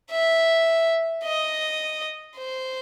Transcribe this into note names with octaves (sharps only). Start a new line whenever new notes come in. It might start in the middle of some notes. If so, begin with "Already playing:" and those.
E5
D#5
C5